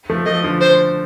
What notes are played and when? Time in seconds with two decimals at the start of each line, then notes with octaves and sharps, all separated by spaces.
0.10 F3 A3
0.26 F3 A3 D#5
0.43 D3 F3
0.61 C5